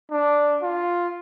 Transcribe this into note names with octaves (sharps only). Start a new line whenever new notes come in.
D4
F4